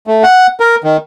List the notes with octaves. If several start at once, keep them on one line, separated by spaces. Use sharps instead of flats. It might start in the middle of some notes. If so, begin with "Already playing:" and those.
A3
F#5
A#4
D#3